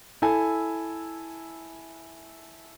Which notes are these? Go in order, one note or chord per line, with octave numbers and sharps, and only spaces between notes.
E4 A4 G#5